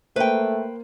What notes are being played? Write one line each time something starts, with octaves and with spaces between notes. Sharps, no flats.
A3 A#3 B4 C5 G5